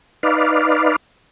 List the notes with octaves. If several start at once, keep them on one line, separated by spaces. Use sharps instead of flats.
D#4 B4 D5 F5